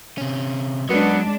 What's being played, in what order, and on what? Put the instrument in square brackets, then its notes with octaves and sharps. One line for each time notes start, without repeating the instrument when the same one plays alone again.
[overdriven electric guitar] C3 C#4
[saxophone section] F#2 B3 [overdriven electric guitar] F#3 [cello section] G#3 D4